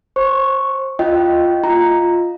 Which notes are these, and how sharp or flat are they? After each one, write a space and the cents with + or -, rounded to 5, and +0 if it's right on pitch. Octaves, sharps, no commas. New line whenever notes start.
C5 +25 C#6 +0
F4 -5 D#5 +5 G5 -20
F4 +0 D#5 +0 A#5 +0